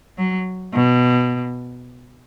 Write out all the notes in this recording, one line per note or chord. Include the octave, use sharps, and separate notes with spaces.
F#3
B2